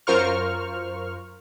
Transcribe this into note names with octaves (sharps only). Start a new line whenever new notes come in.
F#2 F4 A#4 C5 C#6 F6